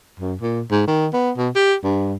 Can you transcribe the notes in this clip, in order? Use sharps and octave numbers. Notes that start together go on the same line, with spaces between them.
F#2
A#2
G#2
D#3
B3
B2
G4
G2